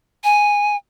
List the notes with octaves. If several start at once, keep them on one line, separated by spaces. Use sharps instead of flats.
G#5